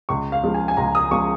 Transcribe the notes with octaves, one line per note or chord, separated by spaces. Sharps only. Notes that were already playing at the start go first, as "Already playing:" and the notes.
C#2 C#6
F5
C#3 F3 G#3
G#5
G#5
C#2 A#5
D#6
C#3 F3 G#3 C#6